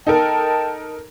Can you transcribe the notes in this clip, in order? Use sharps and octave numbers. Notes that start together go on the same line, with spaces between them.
D#4 A4 A#4 D#5 G5 A5